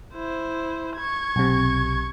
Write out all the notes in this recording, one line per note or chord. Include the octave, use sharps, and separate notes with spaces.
E4 C5
C#6 G#6
B1 C3